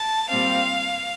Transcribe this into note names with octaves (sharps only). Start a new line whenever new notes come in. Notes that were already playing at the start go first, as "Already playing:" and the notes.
Already playing: A5
A#2 G3 C4 F5